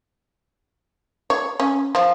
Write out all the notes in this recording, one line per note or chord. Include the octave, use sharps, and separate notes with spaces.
C#5
C#4
F3